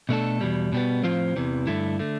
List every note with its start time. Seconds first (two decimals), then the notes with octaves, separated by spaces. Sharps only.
0.09 B2 A3 D4 A4
0.41 E2 B2 G3
0.72 B2 G3 B3
1.03 A2 F3 C4 F4 C5
1.36 E2 C3 E3
1.67 G2 D3 A3 E4
1.99 D3 A3